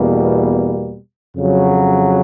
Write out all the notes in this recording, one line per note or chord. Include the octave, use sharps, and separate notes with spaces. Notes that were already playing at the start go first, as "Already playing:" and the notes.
Already playing: E2 B2 G3 A#3
F2 C#3 F#3